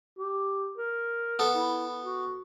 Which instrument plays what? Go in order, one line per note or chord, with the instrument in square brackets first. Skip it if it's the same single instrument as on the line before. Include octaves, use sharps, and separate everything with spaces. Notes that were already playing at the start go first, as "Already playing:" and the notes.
[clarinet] G4
A#4
[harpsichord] B3 A4
[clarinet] E4
F#4